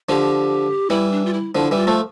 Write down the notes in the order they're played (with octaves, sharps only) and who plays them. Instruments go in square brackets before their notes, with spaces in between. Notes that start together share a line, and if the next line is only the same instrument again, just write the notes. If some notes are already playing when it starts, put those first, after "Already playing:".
[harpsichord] D3 F3 [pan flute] G4
[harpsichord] E3 G3 [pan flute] E4
[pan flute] D4
F4
E4
[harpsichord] D3 F3 [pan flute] E4
[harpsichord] E3 G3 [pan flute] F4
[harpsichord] F3 A3